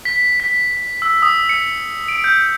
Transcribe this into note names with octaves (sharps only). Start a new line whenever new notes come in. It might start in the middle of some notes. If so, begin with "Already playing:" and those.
B6
B6
E6
D#6
C#7
D7
G6